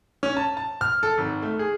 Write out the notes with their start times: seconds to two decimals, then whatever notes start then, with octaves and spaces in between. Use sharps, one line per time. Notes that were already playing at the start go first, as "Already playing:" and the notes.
0.23 C#4
0.37 A5
0.57 A5
0.81 F6
1.03 A4
1.18 G#1
1.42 A3
1.59 G#4